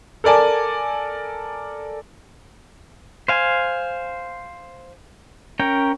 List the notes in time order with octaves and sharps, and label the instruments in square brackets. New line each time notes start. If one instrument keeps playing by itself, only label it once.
[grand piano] A4 A#4 D5 G#5 A5
[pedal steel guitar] C5 F5 G#5
C#4 A#4 G5